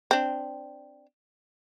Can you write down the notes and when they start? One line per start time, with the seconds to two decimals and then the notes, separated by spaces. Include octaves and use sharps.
0.11 C4 D4